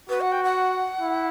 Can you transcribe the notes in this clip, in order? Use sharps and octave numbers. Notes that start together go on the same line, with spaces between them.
F#4 B4
F#5
G5
F#5
E4